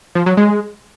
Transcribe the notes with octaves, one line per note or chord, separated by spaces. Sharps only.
F3
F#3
G#3